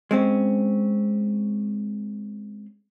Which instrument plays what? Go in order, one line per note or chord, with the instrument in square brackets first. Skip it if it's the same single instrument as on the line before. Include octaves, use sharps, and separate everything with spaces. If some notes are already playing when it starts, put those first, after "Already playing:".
[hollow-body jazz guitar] G#3 C4 C#4